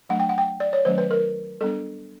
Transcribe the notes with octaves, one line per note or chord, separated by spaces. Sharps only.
F#3 A3 D4 F#5
G5
F#5
G5
D5
C#5
D#3 F#3 A3 C#4 C5
B4
A#4
G3 B3 D4 A4